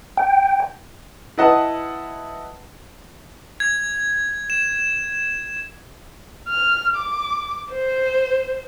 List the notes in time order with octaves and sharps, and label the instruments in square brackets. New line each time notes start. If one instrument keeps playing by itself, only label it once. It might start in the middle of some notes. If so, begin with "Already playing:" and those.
[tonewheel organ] G5
[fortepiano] E4 B4 D#5 F#5 A5
[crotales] G#6
E7
[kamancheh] F6
D6
C5